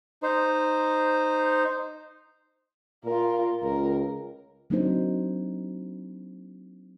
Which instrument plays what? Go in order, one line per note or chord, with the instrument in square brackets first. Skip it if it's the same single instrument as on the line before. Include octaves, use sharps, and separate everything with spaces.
[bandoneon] D#4 C5
[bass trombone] A#2 [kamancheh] F4 A#4
[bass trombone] C#2 [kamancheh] A#4
[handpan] F#3 A#3 C4 D4 D#4 C5